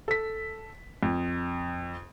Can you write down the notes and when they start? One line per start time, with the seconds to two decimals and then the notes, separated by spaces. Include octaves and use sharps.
0.08 A4 B6
1.03 F2